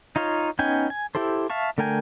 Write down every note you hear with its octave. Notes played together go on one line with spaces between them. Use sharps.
D#4 F4 C#5 F5
B3 C#4 D#4 G5 G#5
G#5
E4 G4 A4 C5
E5 F5 A5 C#6
D3 A3 A#4 G5 G#5